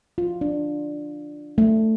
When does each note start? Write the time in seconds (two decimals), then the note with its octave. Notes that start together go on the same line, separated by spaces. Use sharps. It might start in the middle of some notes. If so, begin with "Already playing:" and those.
0.18 F4
0.41 D4
1.58 A3